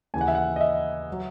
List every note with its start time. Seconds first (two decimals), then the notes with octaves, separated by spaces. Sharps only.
0.14 D#2 C#3 E3 G#5
0.21 F#5
0.28 E5
0.35 F#5
0.56 D#5
0.61 E5
1.12 F#3